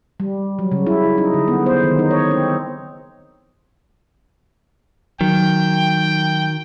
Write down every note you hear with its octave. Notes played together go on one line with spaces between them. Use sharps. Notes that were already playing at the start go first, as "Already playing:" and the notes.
G3
F#3
C#3
E4
D#4
D3
B3
C5
D#3
D#4
C#5
C4
D#3 F#3 G5